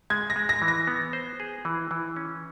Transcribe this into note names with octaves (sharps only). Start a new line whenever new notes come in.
G#3 G#6
A#6
G#3
A#6
E3
A#6
B3
C5
G#4
E3
E3
C#4